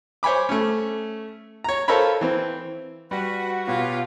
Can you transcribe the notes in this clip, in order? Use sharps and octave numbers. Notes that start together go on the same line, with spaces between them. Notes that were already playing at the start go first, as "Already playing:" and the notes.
C5 C#5 G#5 B5 D6
A3 C#4
C#5 A#5
F4 A4 A#4 C5 C#5 B5
E3 C4
G3 F#4 B4
B2 F4 G4 B4 C#5